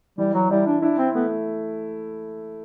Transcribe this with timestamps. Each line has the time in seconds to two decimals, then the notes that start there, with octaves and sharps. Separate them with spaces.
0.18 E3 G3
0.35 F#3
0.51 G3 E4
0.66 D4
0.82 D4 E4
0.98 C4
1.15 A3 B3